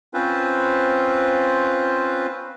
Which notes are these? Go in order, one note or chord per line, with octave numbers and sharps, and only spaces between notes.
C4 C#4 F4 B4 C5